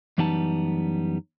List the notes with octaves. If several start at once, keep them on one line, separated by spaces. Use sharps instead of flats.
F#2 E3 G3 B3 D#4 A5